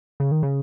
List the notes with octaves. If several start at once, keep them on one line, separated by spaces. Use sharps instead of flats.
C#3
D#3
C#3